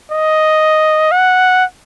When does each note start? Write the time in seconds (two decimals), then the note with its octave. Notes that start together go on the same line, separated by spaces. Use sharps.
0.11 D#5
1.12 F#5